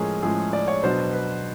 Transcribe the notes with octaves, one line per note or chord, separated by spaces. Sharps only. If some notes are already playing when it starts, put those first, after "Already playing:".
Already playing: A2 F3 G#3 C#4 G#4 A#4
A2 F3 G#3 C#4 G#4
D5
C#5
B2 F#3 B3 D4 C5
B4